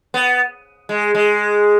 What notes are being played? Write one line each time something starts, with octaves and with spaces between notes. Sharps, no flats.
B3
G#3
G#3